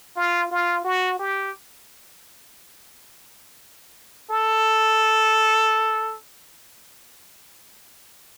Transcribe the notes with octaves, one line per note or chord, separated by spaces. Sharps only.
F4
F4
F#4
G4
A4